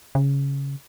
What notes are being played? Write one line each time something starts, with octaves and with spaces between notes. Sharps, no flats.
C#3